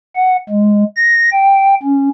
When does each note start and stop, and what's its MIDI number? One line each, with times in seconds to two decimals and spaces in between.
0.16 0.37 78
0.50 0.84 56
0.96 1.30 94
1.33 1.75 79
1.82 2.09 61